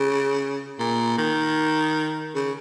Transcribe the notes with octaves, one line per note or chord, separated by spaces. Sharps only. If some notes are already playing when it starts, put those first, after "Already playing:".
Already playing: C#3
A#2
D#3
C#3